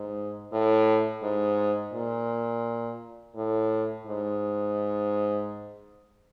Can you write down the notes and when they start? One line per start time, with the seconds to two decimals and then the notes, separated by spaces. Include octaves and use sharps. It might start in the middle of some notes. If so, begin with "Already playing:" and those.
Already playing: G#2
0.52 A2
1.23 G#2
1.93 A#2
3.36 A2
4.07 G#2